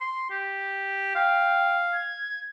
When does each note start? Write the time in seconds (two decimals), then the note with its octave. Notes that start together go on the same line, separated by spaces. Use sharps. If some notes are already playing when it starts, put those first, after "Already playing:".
0.01 C6
0.31 G4
1.15 F5 G5
1.93 G#6